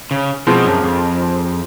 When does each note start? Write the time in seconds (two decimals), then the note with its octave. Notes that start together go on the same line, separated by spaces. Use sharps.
0.11 C#3
0.47 B2 F3 G#3 C4
0.65 F#2
0.83 F2